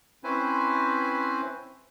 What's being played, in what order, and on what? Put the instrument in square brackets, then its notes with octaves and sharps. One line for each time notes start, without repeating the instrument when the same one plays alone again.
[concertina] C4 C#4 E4 B4 C5 G#5